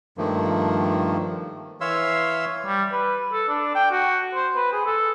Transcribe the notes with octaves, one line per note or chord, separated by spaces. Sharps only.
G2 D#3 F3 A3 A#3
E3 C#5 E5 F5 C6 E6
G3
B4
A4
D4
G5
F#4
C5
B4
G#4
A4